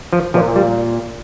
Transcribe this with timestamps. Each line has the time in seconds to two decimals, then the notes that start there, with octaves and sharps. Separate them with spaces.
0.13 F3
0.34 A#2 F3
0.56 G3